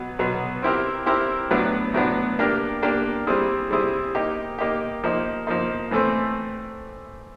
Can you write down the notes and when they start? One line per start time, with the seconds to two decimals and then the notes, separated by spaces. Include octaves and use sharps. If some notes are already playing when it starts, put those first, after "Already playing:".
Already playing: B2 F#3 B3
0.19 B2 F#3 B3
0.62 C4 E4 G4 A#4
1.06 C4 E4 G4 A#4
1.51 A2 F#3 B3 D4
1.94 A2 F#3 B3 D4
2.39 A#3 D4 G4 A#4
2.82 A#3 D4 G4 A#4
3.27 G3 C4 E4 G#4
3.71 G3 C4 E4 G#4
4.15 A#3 D#4 G4
4.59 A#3 D#4 G4
5.04 F3 A#3 D#4
5.47 F3 A#3 D#4
5.91 A2 E3 A3 C4